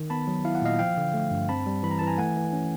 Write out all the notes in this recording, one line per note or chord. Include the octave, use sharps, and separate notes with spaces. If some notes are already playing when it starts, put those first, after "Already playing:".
Already playing: D#3
B3 A5 B5
F#3
E4 F5
F#5
A#2 D#5 F5
F3 F5 G5
D3
A3
G2
C4 A5 B5
G3
E3 B5
A#5
E3 A5
G#5 A#5
A3 F#5 G#5
E3
C#4